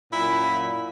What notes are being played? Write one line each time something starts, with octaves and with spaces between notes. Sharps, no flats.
F#2 A#2 E4